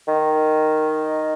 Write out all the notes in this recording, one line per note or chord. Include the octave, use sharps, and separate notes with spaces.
D#3